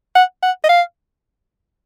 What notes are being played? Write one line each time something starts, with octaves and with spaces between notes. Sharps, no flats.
F#5
F#5
D#5
F5